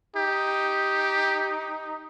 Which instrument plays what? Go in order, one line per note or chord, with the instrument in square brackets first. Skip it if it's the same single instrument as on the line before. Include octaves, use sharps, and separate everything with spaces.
[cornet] D#4 [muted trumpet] G4